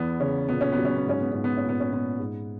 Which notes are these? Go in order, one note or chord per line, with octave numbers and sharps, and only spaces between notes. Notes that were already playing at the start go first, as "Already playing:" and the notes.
Already playing: E2 B3
C#3 C#4
A#2 B3
C#4
B3
F#3
C#4
B3
G#2 C#4
B3
G#2 C#4
B3
A#2 C#4
B3
C#4
A#2 B3
G#2